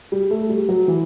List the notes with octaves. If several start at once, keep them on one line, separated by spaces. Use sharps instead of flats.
G3
A3
G3
F#3
E3